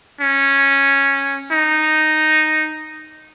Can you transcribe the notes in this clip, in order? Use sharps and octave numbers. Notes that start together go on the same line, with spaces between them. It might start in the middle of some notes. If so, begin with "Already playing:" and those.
C#4
D#4